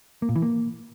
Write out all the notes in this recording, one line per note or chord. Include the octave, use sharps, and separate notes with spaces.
A#3
A#2
E3
A#3